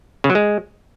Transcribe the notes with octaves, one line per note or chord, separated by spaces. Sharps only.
C#3
F#3
G#3